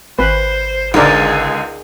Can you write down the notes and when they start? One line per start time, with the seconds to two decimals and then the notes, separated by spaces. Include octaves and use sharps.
0.19 G#1 B4 C5
0.94 C#2 D3 D#4 G#4 A#4 D5